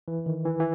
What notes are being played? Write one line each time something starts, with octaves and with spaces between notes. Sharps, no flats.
E3
D#3
E3
E3